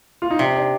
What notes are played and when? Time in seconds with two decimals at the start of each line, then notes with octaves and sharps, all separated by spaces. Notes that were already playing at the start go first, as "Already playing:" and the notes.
0.22 F4
0.31 D#4
0.39 C3 D4
0.55 D4